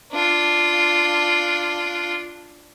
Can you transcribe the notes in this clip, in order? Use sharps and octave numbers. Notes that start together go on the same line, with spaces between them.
D4 F4